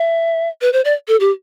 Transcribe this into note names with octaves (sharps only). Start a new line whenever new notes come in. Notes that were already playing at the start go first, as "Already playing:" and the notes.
Already playing: E5
B4
C5
D5
A4
G4